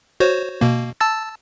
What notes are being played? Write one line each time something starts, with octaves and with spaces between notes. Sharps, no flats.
F#4 C5 C#5
B2 A#3
A5 E6 A6